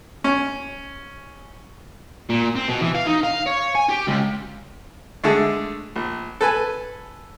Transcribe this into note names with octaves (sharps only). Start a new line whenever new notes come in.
C#4
A#2
C4
B2
E3
F5
D#4
F5
C#5
G#5
G4
C#2
D3 G#3 A3
A#1
A4 B4 G#5